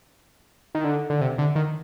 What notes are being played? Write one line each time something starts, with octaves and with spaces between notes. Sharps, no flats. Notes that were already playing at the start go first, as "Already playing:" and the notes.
D#3
D3
D3
C3
D3
D#3